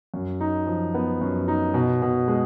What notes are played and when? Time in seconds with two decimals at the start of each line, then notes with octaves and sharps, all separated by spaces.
0.14 F#2
0.41 D#4
0.67 F3
0.95 B3
1.21 F#2
1.48 D#4
1.74 B2
2.02 B2
2.28 G#3